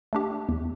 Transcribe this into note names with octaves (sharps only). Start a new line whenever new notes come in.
A3 D4 G4
E2